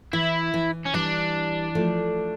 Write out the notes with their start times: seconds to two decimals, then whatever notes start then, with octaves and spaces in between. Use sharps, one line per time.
0.13 E3 E4
0.54 E3
0.86 C#4
0.94 E3 G3 D4
1.75 F3 A3